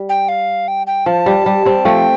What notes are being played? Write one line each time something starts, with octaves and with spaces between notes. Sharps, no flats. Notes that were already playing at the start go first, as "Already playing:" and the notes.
Already playing: G3
G5
F5
G5
G5
F3 A5
G3
G3
G3 C4
F3 A3 G5